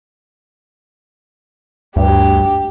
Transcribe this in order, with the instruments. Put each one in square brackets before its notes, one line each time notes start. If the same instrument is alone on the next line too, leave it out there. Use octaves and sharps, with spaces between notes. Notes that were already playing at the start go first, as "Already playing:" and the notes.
[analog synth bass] D2 [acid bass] G2 [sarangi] G4